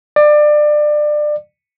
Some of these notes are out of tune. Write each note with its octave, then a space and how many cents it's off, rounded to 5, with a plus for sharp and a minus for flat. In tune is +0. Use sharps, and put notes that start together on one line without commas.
D5 +25